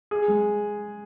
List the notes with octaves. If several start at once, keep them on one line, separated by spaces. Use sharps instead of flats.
G#4
G#3